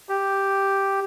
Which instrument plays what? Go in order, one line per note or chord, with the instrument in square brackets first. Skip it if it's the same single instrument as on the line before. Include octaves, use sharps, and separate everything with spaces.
[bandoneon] G4